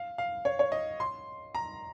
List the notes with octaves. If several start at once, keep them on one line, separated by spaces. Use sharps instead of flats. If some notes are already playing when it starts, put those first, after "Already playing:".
Already playing: F5
F5
C#5
C#5
D#5
C6
A#5